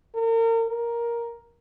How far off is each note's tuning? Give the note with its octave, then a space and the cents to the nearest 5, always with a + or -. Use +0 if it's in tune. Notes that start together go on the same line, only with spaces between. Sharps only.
A#4 -35
A#4 +5